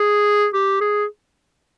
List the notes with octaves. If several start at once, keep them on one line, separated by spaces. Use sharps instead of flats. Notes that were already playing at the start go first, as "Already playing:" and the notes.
Already playing: G#4
G4
G#4